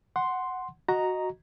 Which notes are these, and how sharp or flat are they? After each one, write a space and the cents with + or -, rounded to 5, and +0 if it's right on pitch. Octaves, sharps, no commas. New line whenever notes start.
F#5 +0 C6 +0
F#4 +0 D#5 +0 A#5 +0